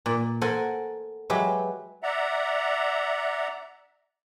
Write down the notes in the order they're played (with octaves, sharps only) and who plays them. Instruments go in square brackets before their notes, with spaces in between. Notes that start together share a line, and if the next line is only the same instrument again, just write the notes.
[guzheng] A#2
A4 A#4 C5 F#5 G#5
F#3 G#3 G4 B4 E5
[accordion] D5 E5 F#5 A#5